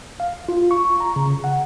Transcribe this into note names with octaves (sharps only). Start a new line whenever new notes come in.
F5
F4
C#6
A#5
C#3
F#5